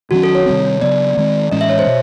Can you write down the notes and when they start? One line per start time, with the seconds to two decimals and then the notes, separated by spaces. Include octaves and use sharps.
0.11 D#3 F#3 A3 C#4 F#4
0.23 A4
0.35 C#5
0.46 C3 D#3 G3 C4
0.81 C#3 F#3 B3 D5
1.17 D#3 G#3 C4
1.51 A2 E3 G#3 C#4 D#5
1.61 E5
1.70 C#5
1.79 C5
1.87 B2